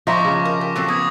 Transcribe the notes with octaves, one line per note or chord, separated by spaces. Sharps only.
F3 D#5 E5 A#5 C#6 D6 A#6
C#3
A#4
G4
F#3 A3 C4
B3 D#6 G#6